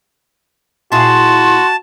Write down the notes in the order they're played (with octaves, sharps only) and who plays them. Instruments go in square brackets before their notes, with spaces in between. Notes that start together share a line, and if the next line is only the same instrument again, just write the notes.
[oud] A#2 E4 G#4 [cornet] F#4 [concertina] A5 [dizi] C6